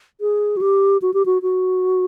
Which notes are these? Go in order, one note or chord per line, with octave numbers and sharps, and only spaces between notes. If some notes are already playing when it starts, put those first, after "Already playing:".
G#4
F#4
G4
F#4
G4
F#4
F#4